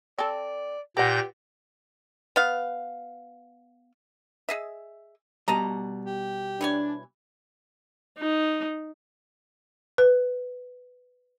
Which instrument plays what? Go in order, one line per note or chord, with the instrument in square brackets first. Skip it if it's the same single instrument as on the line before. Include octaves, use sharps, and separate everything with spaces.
[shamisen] C4 A4 [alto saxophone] D5
[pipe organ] A#2 G6 A#6 [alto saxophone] G4 [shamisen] B4 F#5
[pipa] B3 F5
G#4 D#5 E5
[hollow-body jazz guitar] B2 G3 [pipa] D#5 A5 A#5
[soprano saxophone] G4
[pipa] E3 C#5 G#5 [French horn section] D4
[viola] D#4
[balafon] B4